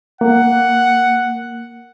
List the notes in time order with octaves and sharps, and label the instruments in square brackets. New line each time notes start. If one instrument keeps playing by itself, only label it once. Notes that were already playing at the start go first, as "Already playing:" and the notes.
[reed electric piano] A#3 [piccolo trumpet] F#5